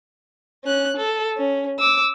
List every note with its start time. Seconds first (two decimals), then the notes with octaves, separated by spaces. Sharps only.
0.64 C#4 F#6
0.96 A4
1.37 C#4
1.79 D6 E6